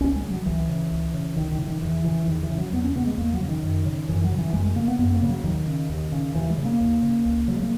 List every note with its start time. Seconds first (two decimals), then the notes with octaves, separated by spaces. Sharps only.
0.01 C#2 C#4
0.16 G#3
0.24 C#3
0.31 F#3
0.46 C#2 E3
0.69 C#3
0.91 C#2
1.14 C#3
1.36 C#2 D#3
1.52 D#3
1.59 C#3 E3
1.67 D#3
1.82 E2 E3
2.04 C#3 E3
2.27 E2 D#3
2.43 E3
2.50 C#3
2.58 F#3
2.72 E2 B3
2.83 C#4
2.95 C#3 B3
3.07 G#3
3.18 E2 A#3
3.33 F#3
3.40 C#3 E3
3.48 D#3
3.63 F#2
3.86 C#3
4.09 F#2 E3
4.24 F#3
4.32 C#3
4.38 E3
4.53 F#2 G#3
4.65 G#3
4.76 C#3 A#3
4.88 B3
4.99 F#2 B3
5.10 B3
5.15 A#3
5.22 C#3
5.29 F#3
5.43 D#2 D#3
5.67 C#3
5.89 D#2
6.12 C#3
6.34 D#2 E3
6.50 G#3
6.58 C#3
6.65 A#3
6.81 D#2
7.02 C#3
7.25 C#2
7.48 C#3 F#3
7.56 G#3
7.63 A#3